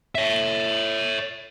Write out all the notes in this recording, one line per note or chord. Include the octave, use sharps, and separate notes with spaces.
C#5 E5